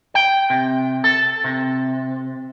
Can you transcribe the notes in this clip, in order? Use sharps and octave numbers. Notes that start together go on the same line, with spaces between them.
G5
C3
A4
C3